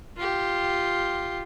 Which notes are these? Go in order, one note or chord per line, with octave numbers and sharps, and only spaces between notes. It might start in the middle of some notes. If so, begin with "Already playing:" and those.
F4 G4